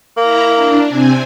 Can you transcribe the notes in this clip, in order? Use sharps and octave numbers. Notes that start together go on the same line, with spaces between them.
A#3 E4 A#5
D4
C3 C4 G#5